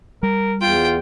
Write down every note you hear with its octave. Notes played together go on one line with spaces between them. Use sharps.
G3 A#4
E2 F4 G5